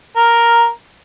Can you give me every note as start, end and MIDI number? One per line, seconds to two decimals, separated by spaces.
0.16 0.69 70